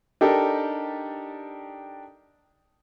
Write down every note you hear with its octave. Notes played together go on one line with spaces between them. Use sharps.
D4 D#4 G4 A4 A#4